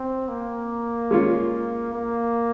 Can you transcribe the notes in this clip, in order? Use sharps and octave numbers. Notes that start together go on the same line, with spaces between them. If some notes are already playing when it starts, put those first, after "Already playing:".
Already playing: C4
A#3
G#3 C#4 F4
A#3